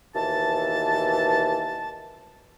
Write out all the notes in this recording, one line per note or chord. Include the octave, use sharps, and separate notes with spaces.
D#2 B2 E3 A5